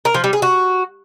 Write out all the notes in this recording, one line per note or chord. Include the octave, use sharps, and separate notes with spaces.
A#4
F3
G3
G#4
F#4